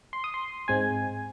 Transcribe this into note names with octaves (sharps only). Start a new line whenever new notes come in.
C6
D#6
C6
G#2 G#3 C4 G#5